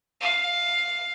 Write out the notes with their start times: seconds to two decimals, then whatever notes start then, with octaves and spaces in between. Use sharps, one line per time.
0.20 F5